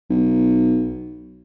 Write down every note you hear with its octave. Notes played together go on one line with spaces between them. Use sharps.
B1